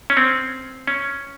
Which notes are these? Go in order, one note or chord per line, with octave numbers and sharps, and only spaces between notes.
C#4
C4
C#4